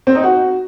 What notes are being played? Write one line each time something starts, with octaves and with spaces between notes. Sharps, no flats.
C4
D#4
F#4